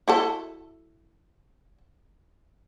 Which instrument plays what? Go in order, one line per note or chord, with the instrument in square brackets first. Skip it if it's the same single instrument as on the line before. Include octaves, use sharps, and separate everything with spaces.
[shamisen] E4 F#4 A4